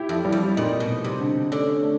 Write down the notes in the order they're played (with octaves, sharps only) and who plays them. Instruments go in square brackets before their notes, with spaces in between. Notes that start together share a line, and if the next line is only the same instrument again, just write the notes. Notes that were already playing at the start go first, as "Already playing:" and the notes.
Already playing: [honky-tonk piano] E4 G4
[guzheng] F2
[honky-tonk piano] G3
[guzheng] F2
[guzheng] A#2 [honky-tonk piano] D#4
[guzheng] B2
[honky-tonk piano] C4
[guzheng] C3
[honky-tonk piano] D3
[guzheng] D3 [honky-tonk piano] C#4
[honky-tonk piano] A3